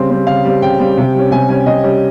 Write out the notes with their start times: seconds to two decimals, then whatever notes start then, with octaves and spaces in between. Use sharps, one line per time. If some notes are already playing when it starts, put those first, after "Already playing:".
Already playing: C#3 G3 C4
0.10 G3 C4
0.27 C#3 F5
0.45 G3 C4
0.62 C#3 G5
0.79 G3 C4
0.97 C3
1.15 G3 C#4
1.31 C3 G#5
1.48 G3 C#4 G#5
1.66 C3 D#5
1.84 G3 C#4